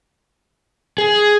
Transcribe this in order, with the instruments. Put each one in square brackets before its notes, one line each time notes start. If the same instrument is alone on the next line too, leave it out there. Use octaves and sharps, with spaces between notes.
[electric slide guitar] G#4